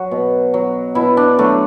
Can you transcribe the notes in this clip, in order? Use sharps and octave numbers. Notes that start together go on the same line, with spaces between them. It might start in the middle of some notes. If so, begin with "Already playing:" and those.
Already playing: F#3 F#4
B2
F#3
B2 E4
D4
F#3 A3